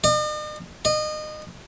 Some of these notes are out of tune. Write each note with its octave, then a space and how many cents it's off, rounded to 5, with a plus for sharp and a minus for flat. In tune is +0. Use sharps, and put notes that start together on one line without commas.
D#5 -45
D#5 -25